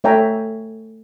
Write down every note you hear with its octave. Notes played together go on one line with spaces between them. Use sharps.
A3 C#5 E5 G5 G#5 A#5